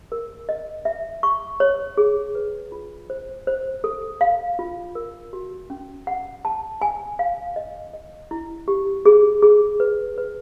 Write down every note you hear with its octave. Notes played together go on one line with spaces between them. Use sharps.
A#4
D#5
E5
C#6
C#5
G#4
B4
F4
C5
C5
A4
F5
F4
A#4
F#4
C#4
F#5
A5
G#5
F5
D#5
D#5
E4
G4
G#4
G#4
B4
B4